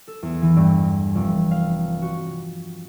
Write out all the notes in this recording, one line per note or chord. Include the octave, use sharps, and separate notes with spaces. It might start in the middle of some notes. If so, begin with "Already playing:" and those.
A4
E2
E3
G2
F1
F5
F#4